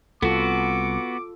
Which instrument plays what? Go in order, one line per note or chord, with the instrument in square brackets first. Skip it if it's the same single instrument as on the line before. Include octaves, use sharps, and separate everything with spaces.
[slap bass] C2 [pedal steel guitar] B3 F#4 [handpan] F4 A4 [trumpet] D6